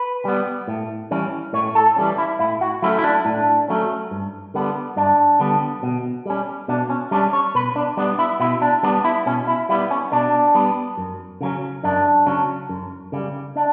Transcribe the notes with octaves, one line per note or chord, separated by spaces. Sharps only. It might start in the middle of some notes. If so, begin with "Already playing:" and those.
Already playing: B4
G3 B3
A2
E3 G3 C#4
A2 C#5
A4
E3 G3 C#4
E4
A2 E4
F#4
F#3 A3 C#4 E4
E4
D4
A2 D4
F#3 A3 C#4
G2
D3 G3 B3
G2 D4
D3 G3 B3
B2
G3 C#4
B2 D4
C#4
G3 C#4 D4
C#5
B2 B4
D4
G3 B3 D4
E4
B2 E4
D4
G3 B3 D4
E4
B2 C#4
E4
G3 B3 E4
C#4
B2 D4
G3 B3
F#2
C#3 F#3 C#4
F#2 D4
C#3 F#3 C#4
F#2
C#3 G3
D4